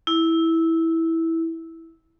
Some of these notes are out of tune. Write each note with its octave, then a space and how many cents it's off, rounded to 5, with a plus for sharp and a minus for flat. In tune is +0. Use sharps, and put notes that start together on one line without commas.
E4 -10